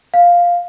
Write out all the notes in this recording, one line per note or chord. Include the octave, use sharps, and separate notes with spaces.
F5